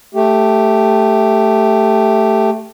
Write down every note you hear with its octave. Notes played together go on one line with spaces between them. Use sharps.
A3 G4